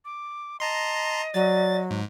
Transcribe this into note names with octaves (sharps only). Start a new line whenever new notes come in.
D6
D#5 A5 A#5 C6
F#3 D5 A6
G#2